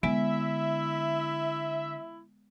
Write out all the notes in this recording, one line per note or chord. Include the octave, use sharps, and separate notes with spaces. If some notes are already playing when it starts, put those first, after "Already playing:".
D3 G#3 B3 E4 E5